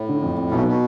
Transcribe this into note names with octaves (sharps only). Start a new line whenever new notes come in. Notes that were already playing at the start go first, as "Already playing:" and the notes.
Already playing: A2
D3
F2
F2
B1 B2
B2